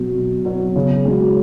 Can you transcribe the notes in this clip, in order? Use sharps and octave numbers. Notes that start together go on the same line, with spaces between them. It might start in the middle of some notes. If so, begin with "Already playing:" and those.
Already playing: B2 F#3 B3 F#4
B2
F#3 B3 F#4
C#3
G#3 C#4 F#4